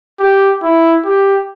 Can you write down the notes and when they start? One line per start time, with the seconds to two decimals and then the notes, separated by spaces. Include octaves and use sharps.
0.19 G4
0.63 E4
1.05 G4